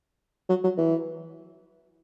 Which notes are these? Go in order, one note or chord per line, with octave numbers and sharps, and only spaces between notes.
F#3
F#3
E3